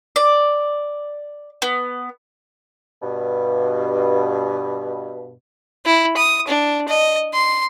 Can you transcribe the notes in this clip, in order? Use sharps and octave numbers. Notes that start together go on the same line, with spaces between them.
D5
B3
G2 B2
E4
D#6
D4
D#5
C6